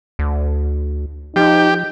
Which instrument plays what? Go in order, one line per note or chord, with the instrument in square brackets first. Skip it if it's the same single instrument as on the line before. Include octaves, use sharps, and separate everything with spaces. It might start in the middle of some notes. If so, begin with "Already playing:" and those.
[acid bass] D2
[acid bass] F3 [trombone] D#4 [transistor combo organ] G4